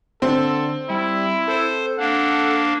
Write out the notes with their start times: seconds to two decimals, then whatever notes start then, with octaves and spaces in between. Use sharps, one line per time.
0.22 D3 C4 A4
0.90 G3 E4
1.48 A4 C5
1.98 A#3 D4 F#5